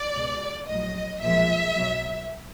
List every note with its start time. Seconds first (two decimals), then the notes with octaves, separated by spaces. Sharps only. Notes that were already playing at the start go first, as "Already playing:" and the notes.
Already playing: D5
0.14 C#2 B2 G#3
0.68 A#1 A2 F#3 D#5
1.21 B1 A#2 F3 G#3 E5
1.74 B1 B2 F#3